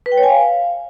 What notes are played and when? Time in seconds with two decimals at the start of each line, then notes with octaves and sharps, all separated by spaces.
0.06 B4
0.12 G5
0.18 C#5
0.23 G#5
0.29 F5